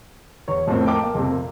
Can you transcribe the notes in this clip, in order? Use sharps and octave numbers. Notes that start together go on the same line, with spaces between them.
E2 C#5
F2 A2 F3 A#3 C4
A#4 D#5 G5 A5 D6
A#3
F2 C3
A#2